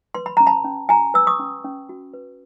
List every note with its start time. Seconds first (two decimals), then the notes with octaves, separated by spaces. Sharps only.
0.15 B4 C6
0.26 B5
0.37 C#4 A#5
0.47 A5 B5
0.65 C#4
0.89 F#4 G#5 A#5
1.14 B4 E6
1.27 C#6 D#6
1.39 C#4
1.64 C#4
1.89 F#4
2.14 B4